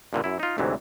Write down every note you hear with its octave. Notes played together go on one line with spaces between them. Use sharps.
G2 A#2 D3 E3
F#2 E4
D#4 F4
D2 G#2 C3 E3 F#3